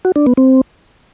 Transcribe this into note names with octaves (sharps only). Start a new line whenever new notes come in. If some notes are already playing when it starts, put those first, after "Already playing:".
F#4
D4
B3
C4